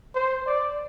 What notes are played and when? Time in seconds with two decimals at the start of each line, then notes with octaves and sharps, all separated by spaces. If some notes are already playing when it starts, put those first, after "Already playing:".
0.15 C5
0.47 D5